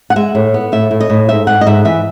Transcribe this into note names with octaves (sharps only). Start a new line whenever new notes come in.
F#5
G#3 E5
A2
B3
A2 E5
A2
D#5
A2
G#2 E5
G#2 F#5
D#5
G#2 E5
E3 E5